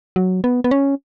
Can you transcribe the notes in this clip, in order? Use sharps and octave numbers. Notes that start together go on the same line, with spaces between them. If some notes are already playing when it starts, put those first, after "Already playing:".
F#3
B3
B3
C#4